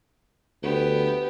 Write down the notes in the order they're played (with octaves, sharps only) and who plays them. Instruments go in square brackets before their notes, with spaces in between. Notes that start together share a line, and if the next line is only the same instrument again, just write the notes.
[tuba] D2 [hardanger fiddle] B3 G4